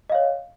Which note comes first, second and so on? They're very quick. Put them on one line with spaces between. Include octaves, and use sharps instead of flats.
D#5 F5 C#5